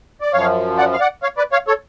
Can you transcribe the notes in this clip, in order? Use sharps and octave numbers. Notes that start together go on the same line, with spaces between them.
D5
F#2 F3 C#5 F5
D5 F#5
F5
D5 F#5
C#5 F5
B4 D5
C#5 F5
A4 C#5